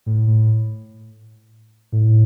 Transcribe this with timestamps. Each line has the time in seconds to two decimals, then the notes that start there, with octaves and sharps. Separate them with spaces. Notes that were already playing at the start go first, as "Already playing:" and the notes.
0.06 A2
0.27 A2
1.92 A2